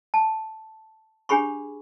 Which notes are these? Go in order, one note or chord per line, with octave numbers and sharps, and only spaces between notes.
A5
D4 G4 G#4 B5 C#6